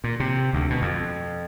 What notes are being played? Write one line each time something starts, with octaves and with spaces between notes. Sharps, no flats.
A#2
C3
D2
B2
F2